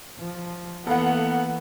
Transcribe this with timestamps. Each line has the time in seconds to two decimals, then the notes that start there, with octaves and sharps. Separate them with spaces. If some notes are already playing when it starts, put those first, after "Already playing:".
0.19 F3
0.87 E3 A#3 B3 A4 F5 F#5